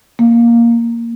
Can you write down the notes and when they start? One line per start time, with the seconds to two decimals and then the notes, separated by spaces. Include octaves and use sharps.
0.19 A#3